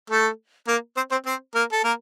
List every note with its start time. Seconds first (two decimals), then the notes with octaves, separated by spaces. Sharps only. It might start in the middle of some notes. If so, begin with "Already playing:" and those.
0.10 A3 A4
0.67 A#3 A#4
0.97 C4 C5
1.11 C4 C5
1.26 C4 C5
1.55 A#3 A#4
1.72 A4
1.84 A#3 A#4